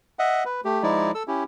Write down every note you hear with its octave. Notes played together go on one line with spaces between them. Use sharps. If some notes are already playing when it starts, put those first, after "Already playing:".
D#5 E5 F#5
B4
A3 G4
F3 G#3 D#4 E4 D5
A4 E6
C#4 E4 G4